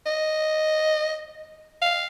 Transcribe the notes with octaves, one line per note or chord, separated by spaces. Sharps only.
D#5
F5